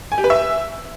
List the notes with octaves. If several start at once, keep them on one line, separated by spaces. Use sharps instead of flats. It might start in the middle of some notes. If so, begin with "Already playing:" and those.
G#5
G4
B4
E5